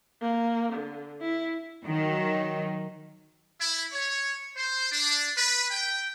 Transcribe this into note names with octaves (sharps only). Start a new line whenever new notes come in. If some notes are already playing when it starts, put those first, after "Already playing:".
A#3
D3
E4
D#3 F#3
E4
C#5
C5
D4
B4
G5